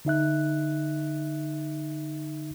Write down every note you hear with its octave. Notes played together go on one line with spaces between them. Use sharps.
D3 D#4 E5 F#6